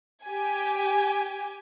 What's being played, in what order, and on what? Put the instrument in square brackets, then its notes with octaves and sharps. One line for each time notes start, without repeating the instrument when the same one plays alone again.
[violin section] G4 G#5